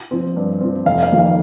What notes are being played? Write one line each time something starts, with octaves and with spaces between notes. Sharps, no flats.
F3 C4
G2
F3 C4
F1 F5
F5
F2 D#3 A#3
F5